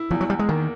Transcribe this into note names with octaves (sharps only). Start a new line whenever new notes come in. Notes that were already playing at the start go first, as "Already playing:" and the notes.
Already playing: E4
E2 F3
F#3
E2 G3
G#3
D#3 A#3